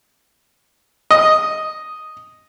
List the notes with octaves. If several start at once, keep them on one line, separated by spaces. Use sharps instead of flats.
D#5